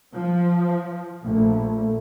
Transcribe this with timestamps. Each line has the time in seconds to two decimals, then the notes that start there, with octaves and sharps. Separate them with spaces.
0.14 F3
1.24 A#1 A3